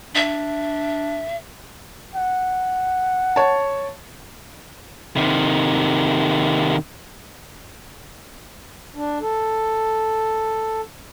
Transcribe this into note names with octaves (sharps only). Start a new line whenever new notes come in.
D4 E5
F#5
C#5 A5
C3 D#3
D4
A4